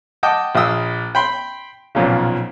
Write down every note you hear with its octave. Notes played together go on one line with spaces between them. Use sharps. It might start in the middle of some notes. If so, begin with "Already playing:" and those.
D#5 F#5 G5 A5 D6 D#6
A#1 F5 G5 D#6 E6
G5 B5 C6
B1 F2 A#2 C#3